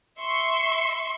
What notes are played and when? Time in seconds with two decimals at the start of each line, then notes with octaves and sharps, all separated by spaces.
0.21 E5 C6 C#6